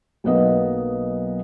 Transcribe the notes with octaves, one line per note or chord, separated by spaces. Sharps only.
B1 A#3 B3 D#5